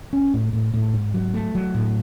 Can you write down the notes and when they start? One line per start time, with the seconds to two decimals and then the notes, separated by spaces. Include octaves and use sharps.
0.13 C#4
0.34 A2
0.53 A2
0.74 A2
0.94 G#2
1.14 F#3
1.34 A3
1.55 F#3
1.74 A2